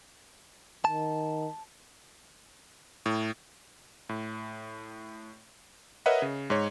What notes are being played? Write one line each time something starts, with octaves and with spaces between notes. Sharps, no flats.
D#3 A5
A2
A2
A#4 B4 C#5 D#5 E5 F#5
C#3
G#2 C#5